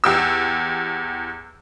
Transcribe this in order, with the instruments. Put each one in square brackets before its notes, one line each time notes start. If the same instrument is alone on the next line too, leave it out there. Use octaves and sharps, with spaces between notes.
[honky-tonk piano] E2 G4 E6